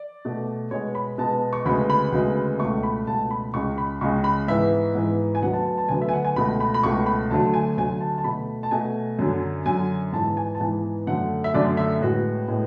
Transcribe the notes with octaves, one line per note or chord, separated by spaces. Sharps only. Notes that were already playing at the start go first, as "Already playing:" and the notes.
Already playing: D5
B2 A3
B2 G#3 B3 C#5
B5
B2 G#3 B3 A5
C#6
D2 C#3 G#3 B3 B5
B5
D2 C#3 G#3 B3
C#2 B2 A3 C#6
B5
C#2 B2 A3 A5
B5
C#2 C#3 G#3 C#6
B5
C#2 C#3 G#3 C#6
B5
G#2 E3 B3 E5
G#2 E3 B3
G#5
D2 D3 F#3 B3 F#5
A5
A5
A5
D2 D3 F#3 B3 G#5
E5
G#5
F#5
G#5
C#2 B2 A3 B5
B5
B5
C#2 B2 A3 C#6
B5
D2 D3 F#3 A3 A5
G#5
D2 D3 F#3 A3 G#5
A5
A5
B2 A3 B5
A5
B2 A3 G#5
F#2 D3 F#3
F#2 D3 F#3 G#5
G#2 E3 B3 A5
G#5
A5
G#2 E3 B3 G#5
F#2 D3 A3 F#5
E5
F#2 D3 A3 D5
E5
A2 G#3 B3 F#4
A2 G#3 B3